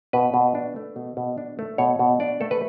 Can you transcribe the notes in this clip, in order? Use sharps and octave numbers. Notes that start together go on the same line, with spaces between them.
B2 B4
B2
D4
A3
B2
B2
D4
A3
B2 C#5
B2
D4 D5
A3 A4
B4